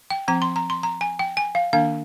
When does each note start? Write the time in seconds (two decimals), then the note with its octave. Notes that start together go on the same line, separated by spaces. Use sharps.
0.10 G5
0.28 F3 C4 A#5
0.42 C6
0.56 A#5
0.70 C6
0.83 A#5
1.01 G#5
1.19 G5
1.37 G#5
1.55 F5
1.73 D#3 A#3 D4 F5